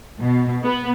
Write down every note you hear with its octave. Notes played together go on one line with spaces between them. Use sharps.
B2
B3